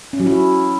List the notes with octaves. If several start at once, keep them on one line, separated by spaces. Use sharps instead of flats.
C#4
F#3
E4